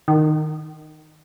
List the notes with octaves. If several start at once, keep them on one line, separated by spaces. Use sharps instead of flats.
D#3